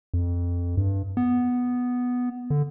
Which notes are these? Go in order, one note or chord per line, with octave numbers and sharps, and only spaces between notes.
F2
G2
B3
D3